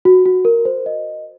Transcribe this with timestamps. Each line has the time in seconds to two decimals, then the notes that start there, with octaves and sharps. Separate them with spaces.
0.05 F#4
0.26 F#4
0.45 A#4
0.65 C5
0.86 D#5